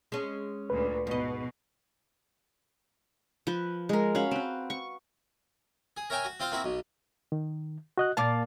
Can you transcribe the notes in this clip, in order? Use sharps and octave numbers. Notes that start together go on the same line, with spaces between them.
G#3 C#4
D2 A#2 B4
G#2 B2 D#5
F3 B4
G#3 A#4
C#4 F#4 F5 B5
C4 B4
C#6
G#4
A#4 C#5 E5 G5 G#5 A#5
F#4
C4 F4 C5 F5
A#3 C4 E4 F#4
B1 B2
D#3
F#4 D#5 F#6
A#2 A#3 F5 A5 D6 A6